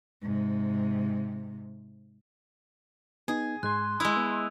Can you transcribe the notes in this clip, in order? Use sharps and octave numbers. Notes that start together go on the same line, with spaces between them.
G#2 C3
B3 D#4 G#4
G#2 G#3 C6 F#6 G#6
G#3 E4 D#6 E6 F7
B3